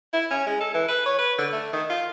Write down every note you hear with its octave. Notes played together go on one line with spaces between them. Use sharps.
E4
C#4
G#3
A4
E3
B4
C#5
B4
D3
A3
D#3
F4